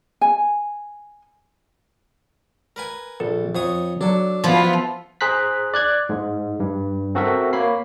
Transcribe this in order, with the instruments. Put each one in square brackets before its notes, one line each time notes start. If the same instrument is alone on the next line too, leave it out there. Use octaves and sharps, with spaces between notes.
[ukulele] G#5
[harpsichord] A#4 B4 G#5
[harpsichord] A#1 [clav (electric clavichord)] A4
[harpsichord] F2 C#5 D#6 [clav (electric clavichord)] C5
[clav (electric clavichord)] F#3 [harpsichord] D4 A4
[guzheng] F3 E4 [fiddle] B3 F4
[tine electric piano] G#4 C5 A#5 F#6 B6
D5 F#6 G#6
G#2 G#3
G2
C4 F#4 A4 A#4 E5
A#3 C#5 B5 B6 C7